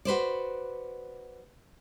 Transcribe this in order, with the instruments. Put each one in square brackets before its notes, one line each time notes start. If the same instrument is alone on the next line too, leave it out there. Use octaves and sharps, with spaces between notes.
[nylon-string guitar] F#4 B4 C5 D5